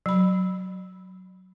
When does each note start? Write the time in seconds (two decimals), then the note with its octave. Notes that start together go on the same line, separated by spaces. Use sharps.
0.06 F#3 B5